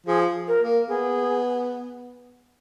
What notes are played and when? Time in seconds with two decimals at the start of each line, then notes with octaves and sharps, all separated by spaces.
0.06 F3 G#4
0.48 A#4
0.61 A#3
0.88 B3 G#4